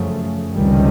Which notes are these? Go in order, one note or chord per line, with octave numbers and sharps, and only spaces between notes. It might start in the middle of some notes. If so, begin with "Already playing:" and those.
Already playing: F#2 C#3 F3 A3
C#2 C3 D#3 G3